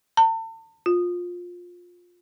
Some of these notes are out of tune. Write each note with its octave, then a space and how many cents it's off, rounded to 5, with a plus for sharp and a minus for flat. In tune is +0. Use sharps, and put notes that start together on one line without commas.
A5 +40
F4 +20